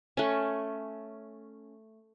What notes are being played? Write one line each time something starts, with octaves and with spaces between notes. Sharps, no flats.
A3 C#4